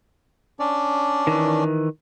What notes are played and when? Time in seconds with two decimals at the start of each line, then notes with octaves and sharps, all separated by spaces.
0.59 C#4 D4 D5
1.27 D#3 E3